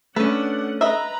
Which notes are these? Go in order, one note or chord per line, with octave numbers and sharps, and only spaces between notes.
A3 C#4 D4 B4 F#5
B4 D#5 E5 A#5